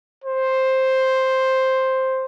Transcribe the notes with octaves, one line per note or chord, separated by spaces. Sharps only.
C5